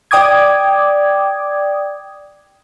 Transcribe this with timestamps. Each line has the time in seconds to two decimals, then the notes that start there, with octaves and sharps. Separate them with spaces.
0.11 D5 G5 D6 D#6 G#6